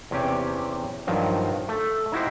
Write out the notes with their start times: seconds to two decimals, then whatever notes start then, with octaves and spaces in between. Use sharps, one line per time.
0.11 E2 C3 C#4 G4 C#5
1.07 G2 D#3 F3 F#3
1.69 A3 A4
2.12 D#4 E4 F#4 G4 C5